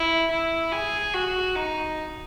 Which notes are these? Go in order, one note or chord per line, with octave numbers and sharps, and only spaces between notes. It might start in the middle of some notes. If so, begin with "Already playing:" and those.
Already playing: E4
E4
G#4
F#4
D#4